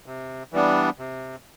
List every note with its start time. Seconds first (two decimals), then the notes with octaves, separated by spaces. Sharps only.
0.06 C3
0.52 E3 G3 B3 D4
0.99 C3